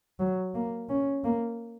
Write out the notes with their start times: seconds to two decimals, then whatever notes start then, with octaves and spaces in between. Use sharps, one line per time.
0.19 F#3
0.55 A#3
0.89 C#4
1.24 A#3